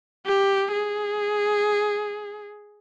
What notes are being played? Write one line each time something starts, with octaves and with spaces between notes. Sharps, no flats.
G4
G#4